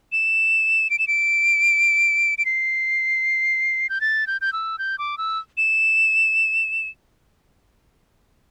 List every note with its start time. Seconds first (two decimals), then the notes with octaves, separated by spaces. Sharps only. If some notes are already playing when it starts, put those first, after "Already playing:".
0.12 E7
0.90 D7
0.99 E7
1.08 D7
2.38 D7
2.45 C7
3.89 G6
4.01 A6
4.27 G6
4.41 G6
4.53 E6
4.79 G6
4.99 D6
5.18 E6
5.57 E7